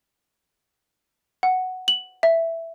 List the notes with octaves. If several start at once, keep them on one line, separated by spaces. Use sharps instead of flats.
F#5
F#7
E5